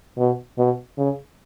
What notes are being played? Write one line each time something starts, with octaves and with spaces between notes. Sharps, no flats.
B2
B2
C#3